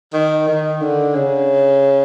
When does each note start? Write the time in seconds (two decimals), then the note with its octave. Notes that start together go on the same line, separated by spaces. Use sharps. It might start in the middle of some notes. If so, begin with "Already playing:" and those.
0.14 D#3
0.48 D#3
0.82 D3
1.15 C#3